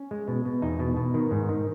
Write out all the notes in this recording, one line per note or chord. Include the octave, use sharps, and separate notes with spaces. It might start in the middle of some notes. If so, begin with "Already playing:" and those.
Already playing: C#4
G#3
B2
B2
E2 D#4
B2
B2
D#3
G#2
D#3